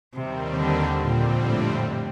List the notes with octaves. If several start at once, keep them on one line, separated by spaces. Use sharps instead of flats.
D#2 C3 D#3 G3 C4
D3
F2 A#2 D3 G3 C4
A2